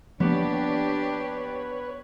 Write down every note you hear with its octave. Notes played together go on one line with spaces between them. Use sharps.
F3 A#3 B3 D4 G4 B4 C#5